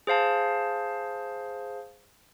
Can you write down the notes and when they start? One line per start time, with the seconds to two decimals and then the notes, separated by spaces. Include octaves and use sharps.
0.07 G#4 C5 F5 A5